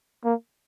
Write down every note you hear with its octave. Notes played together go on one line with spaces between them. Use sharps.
A#3